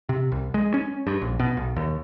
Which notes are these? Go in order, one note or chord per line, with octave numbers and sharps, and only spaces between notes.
C3
C2
G#3
C#4
G2
A#1
B2
B1
D#2